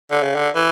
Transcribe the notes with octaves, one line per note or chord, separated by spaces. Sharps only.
D3
C#3
D3
E3